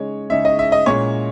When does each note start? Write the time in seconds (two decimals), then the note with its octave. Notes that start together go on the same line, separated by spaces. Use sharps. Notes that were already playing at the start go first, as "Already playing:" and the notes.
Already playing: C#3 G#3 D#4 C#5
0.30 C#3 G#3 D#4 E5
0.45 D#5
0.59 E5
0.72 D#5
0.86 A#2 G#3 C#4 C#5